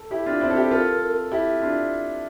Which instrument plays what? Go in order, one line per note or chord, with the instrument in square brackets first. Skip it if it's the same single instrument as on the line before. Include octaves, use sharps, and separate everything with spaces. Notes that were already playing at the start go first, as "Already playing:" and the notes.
Already playing: [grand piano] A4
E4 G4
D4 F4
C4 E4
A4
E4 G4
[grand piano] F4 A4 [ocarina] A#4
[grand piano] E4 G4
D4 F4